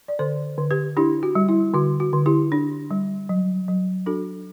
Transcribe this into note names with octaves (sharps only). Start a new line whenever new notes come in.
D5
D3 A4 C5
D3
G4 B4
D4 E4 G4
F#4
G3
E4
D3 F#4
F#4
D3
E4 G4
D4
G3
F#3
F#3
D4 F#4 A4